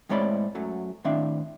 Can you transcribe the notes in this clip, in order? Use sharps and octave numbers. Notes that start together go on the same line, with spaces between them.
A2 G#3 C4 C#5 D5 B5
F#2 F#3 A3
A2 D#3 C4 D4 E5 F5